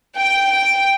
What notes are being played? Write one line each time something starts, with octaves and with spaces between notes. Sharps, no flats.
G5
G5